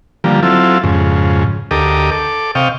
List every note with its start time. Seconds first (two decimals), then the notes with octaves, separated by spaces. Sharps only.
0.24 D3 F3 G3 A#3
0.43 F#3 C4 E4 F4 A4
0.84 F2 G#2 C#3
1.71 D2 G4 A4 A#4 D#5 D6
2.11 A4 D6
2.55 C3 D#5 F5 G5 C#6